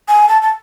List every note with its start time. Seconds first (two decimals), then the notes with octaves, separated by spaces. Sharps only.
0.08 G#5
0.29 A5
0.42 A5